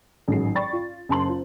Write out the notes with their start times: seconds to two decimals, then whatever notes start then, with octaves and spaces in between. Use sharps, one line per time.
0.28 A1 G#2 D#3 F#3 G#4 C7
0.55 D5 G5 B5 C#6 A6
0.73 F4
1.09 F#1 A5 C6 F#7
1.26 F4 C5